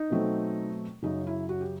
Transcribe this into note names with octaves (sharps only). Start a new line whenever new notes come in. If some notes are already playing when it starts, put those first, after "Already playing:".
Already playing: D#4
B2 F#3 A3 C4
F#2 C#3 F#3 D#4
E4
F#4
G4